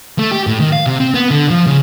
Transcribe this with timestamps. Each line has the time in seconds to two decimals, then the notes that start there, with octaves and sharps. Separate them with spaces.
0.19 A3
0.31 G4
0.47 A2
0.60 D#3
0.73 F5
0.86 C3
1.00 C4
1.14 B3
1.31 D3
1.50 F3
1.67 C#3